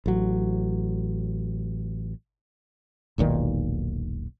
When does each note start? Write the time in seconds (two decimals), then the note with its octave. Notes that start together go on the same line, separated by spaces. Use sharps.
0.06 A1 F#3
3.18 E1 B1 A#2 D#3